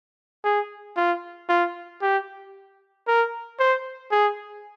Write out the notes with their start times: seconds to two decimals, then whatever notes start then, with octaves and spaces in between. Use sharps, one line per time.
0.44 G#4
0.97 F4
1.49 F4
2.02 G4
3.07 A#4
3.60 C5
4.12 G#4